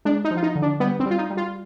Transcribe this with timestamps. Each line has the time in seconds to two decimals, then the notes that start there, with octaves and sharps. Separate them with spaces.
0.05 G#3 D4
0.24 D#4
0.31 F3
0.37 F4
0.43 D#4
0.55 D3
0.62 D4
0.80 G3 B3
1.00 C4
1.06 G3 F4
1.18 D#4
1.30 G3
1.37 F4